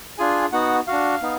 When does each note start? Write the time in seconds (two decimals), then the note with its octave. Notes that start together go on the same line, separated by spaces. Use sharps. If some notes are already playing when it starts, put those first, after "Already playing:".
0.18 D4 F4 G#4 G#5
0.52 B3 D#4 F#4 F#5
0.87 D4 F#4 F5
1.22 B3 D#4